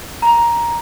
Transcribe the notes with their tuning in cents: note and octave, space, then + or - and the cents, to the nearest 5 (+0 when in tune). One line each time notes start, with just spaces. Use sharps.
A#5 +10